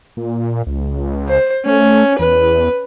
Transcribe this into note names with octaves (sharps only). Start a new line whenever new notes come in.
A#2
C#2
C5
A3 C#4
E2 B4